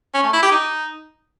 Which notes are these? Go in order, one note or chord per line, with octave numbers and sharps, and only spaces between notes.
C#4
A3
E4
G4
D#4